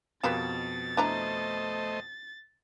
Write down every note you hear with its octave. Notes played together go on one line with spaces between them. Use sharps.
F2 B2 G3 A#3 B4 A6 E7
A3 D4 E4 C5 D#5 A#5